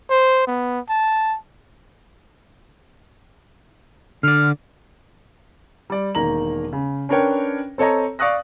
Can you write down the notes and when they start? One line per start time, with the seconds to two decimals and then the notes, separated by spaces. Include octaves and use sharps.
0.10 C5
0.47 B3
0.89 A5
4.23 D3 D5 F6
5.90 G3 D5
6.15 E1 D#3 A#3 A#5 F#7
6.73 C#3
7.09 C#4 D4 A#4 B4 C#5 G5
7.78 C4 A4 C#5 D#5 A#5
8.19 D5 F5 C#6 D#6 F#6 A#6